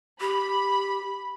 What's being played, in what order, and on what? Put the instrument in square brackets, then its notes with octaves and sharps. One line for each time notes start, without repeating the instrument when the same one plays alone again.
[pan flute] G4 [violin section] B5